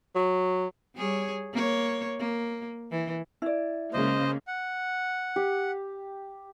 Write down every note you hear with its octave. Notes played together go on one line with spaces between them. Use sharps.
F#3
G3 G#4 C#5
A#3 C#5
A#3
E3
E4 D5
C#3 G#3 A#3 C5 D#5
F#5
G4